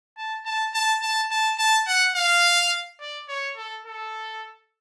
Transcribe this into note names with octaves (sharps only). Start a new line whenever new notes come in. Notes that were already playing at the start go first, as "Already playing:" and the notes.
A5
A5
A5
A5
A5
A5
F#5
F5
D5
C#5
A4
A4